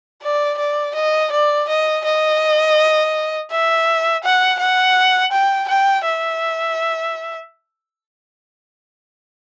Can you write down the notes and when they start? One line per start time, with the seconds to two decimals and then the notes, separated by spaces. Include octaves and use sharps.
0.22 D5
0.58 D5
0.95 D#5
1.32 D5
1.68 D#5
2.04 D#5
3.51 E5
4.24 F#5
4.59 F#5
5.32 G5
5.68 G5
6.04 E5